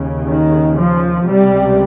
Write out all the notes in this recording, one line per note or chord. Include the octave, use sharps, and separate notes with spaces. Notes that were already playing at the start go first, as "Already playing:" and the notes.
Already playing: D#2 C#3
D#3
F3
C#2 C3 G3